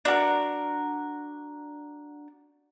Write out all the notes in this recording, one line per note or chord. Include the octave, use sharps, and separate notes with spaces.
D4 F#4 A4 A#4